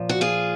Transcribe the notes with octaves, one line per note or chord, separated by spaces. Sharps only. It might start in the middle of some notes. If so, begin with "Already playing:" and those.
Already playing: A#2 F3
F#4
F4 G#4